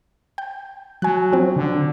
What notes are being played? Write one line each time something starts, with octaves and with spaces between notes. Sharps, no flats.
G5
F#3 G#5 F#6
F3 C4
D3